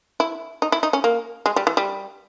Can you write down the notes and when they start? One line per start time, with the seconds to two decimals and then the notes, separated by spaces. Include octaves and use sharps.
0.20 E4
0.62 D#4
0.72 E4
0.83 D#4
0.93 C#4
1.04 A#3
1.46 G#3
1.56 G3
1.67 E3
1.77 G3